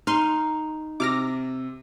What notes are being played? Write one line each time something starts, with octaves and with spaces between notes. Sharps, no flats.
D#4 C6 F6
C3 D6 F6 A#6